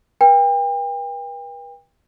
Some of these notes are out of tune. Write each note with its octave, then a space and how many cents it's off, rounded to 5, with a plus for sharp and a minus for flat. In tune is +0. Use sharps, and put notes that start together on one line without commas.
B4 -40 G5 +35